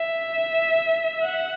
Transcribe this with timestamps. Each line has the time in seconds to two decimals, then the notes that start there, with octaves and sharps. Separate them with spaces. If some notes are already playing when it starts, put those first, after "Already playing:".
Already playing: E5
1.22 F#5